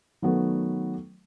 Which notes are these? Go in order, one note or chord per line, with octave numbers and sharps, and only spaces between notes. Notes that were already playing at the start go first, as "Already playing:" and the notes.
D#3 F#3 A3 B3